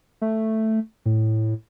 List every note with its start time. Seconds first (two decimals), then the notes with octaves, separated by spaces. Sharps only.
0.22 A3
1.06 A2